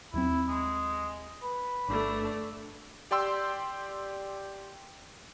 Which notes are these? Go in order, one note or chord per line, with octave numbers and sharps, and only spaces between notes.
D#2 F#3 C4 E4
G#3
B4
G1 A3 D4
G4 D5 G5 C6 E6